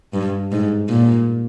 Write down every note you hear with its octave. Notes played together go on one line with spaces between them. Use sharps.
G2
G#2
A#2